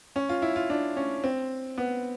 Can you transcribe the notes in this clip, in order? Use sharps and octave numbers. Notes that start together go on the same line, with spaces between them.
C#4
F4
E4
F4
D4
C#4
C4
B3